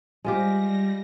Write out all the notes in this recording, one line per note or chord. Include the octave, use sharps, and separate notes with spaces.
G3 G#3 F4 G4 A#6